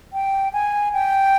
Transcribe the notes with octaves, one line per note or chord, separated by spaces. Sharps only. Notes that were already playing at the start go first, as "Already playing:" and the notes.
G5
G#5
G5